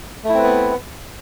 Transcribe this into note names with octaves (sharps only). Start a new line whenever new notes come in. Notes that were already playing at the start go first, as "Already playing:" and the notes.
A3 B3 C4 E4 B4